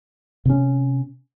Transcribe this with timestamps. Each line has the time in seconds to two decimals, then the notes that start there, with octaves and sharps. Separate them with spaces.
0.45 C3 C#4